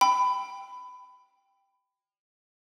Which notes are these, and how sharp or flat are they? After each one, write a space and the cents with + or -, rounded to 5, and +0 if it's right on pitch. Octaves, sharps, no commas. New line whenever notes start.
G5 +5 B5 +20